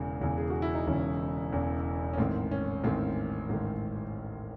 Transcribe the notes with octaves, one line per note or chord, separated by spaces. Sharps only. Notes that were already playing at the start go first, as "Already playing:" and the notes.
Already playing: E1 E2 C#3 E3
E1 E2 C#3 E3
G#4
F#4
E4
D#4
E1 E2 C#3 E3 C#4
E1 E2 C#3 E3
C#4
A1 G#2 D#3 C4
C#4
A1 G#2 D#3 C4
A1 G#2 D#3